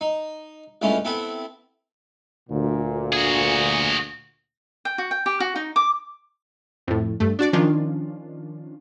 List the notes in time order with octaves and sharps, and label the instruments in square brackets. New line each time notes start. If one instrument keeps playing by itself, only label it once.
[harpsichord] D#4
C#2 G2 A3 C#4 E4 F4
B3 C4 E4 A4 B4
[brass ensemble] D2 A#2
[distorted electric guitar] F#4 G#4
[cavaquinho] G5
F#4
G5
G4
F#4
D#4
D6
[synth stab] F2 A2
G2 A3
D4 F#4 D5
D#3 F3 C#4 D4 F4